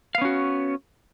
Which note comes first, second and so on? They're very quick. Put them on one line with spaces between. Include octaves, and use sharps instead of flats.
F5 B3 C#4 F#4